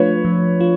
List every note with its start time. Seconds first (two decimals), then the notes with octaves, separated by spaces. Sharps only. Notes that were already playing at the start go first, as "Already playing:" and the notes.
Already playing: F3 A3 D4 F4 B4 C#5
0.25 F3
0.61 F4